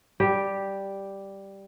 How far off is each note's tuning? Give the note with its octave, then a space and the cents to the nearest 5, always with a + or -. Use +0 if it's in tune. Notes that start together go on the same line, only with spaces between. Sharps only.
G3 +0 G4 +0